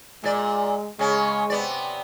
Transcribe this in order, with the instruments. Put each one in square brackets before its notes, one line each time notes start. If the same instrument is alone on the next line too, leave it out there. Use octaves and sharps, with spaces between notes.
[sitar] A#2 D5 [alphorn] G#3
[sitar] C#3 C#4 [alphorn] G#3
[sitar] C3 B3 D5